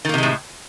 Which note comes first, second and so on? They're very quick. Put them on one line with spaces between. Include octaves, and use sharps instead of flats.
D#3 A#3 C3 G#3 A2